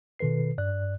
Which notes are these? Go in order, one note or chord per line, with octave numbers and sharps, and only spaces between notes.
B2 D#3 A4 B4 C7
G2 D5 F#6